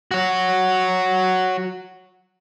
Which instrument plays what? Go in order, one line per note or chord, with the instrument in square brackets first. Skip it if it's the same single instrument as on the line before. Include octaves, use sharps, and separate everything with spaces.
[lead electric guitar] F#4 C#5